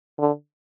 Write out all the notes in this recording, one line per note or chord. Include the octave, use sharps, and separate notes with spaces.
D3